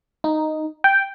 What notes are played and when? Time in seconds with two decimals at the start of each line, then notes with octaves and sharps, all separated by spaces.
0.24 D#4
0.84 G5